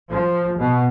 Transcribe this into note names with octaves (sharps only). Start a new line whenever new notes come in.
F3
B2